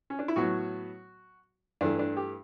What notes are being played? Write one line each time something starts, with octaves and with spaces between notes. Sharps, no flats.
C#4
D4
E4
A2 F#3 B3 F#4
G2 E3 A3 D4
D4
G4